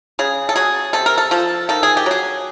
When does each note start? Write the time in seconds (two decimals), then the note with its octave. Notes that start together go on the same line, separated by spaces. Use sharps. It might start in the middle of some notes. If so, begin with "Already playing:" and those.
0.19 C#3 G#4
0.49 A4
0.56 F#3 G#4
0.93 C3 A4
1.06 A#4
1.18 A4
1.31 F3 A4
1.69 D#3 A4
1.83 G#4
1.97 G4
2.06 F#3 G#4